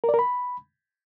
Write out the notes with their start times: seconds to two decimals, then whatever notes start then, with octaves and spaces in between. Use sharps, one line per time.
0.04 A#4
0.09 D5
0.14 A#4
0.19 B5